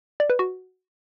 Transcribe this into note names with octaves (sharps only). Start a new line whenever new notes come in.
D5
B4
F#4